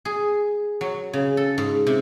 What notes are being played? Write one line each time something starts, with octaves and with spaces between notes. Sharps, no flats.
G#4
F#3
C#3
A4
G#2
C3